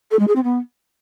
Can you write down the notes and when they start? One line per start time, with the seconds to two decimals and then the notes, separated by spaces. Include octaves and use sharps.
0.11 A4
0.19 G#3
0.27 G#4
0.36 C4
0.44 B3